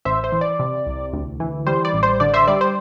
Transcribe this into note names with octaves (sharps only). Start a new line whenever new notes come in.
A1 C5 E5
C5
E3
D5
C3
C2
D2
E3
G3 C5
D5
A1
C5
D3 D5
C5 E5
G3 D5
C5